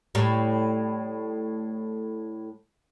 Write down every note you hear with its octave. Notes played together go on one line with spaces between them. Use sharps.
A2 G3